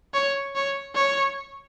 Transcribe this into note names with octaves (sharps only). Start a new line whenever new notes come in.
C#5
C#5
C#5